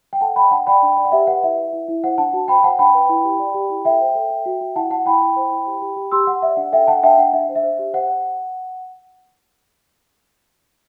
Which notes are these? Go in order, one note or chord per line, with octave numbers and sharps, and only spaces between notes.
G5
A4 F#5 A5
D5 G5 B5
D4 F#5 A5
D5 G5 B5
D4
D5
F#5
G4 E5
B4 F#5
E4 E5
B4
E4
E4
C5 F#5
D4 F#5 A5
F#4
C5 G5 B5
C5 F#5 A5
D4 G5 B5
B4
E4
G4
D5
G4
E4
A4 E5 G5
C5
A4
A4
F#4
F#4
E4 F#5 A5
E4 F#5 A5
E4 G5 B5
E4
C5
E4
G4
G4
G4
G4 C6 E6
G4 F#5
D5 E5
D4 F#5
A4 E5 G5
D4 F#5 A5
D4 E5 G5
D4 F#5
D4 E5
C5
E5
C5
G4
C5 F#5